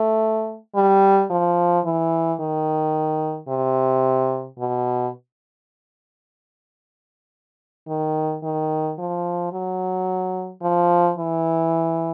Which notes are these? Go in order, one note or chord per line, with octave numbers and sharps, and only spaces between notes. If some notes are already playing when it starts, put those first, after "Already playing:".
Already playing: A3
G3
F3
E3
D#3
C3
B2
D#3
D#3
F3
F#3
F3
E3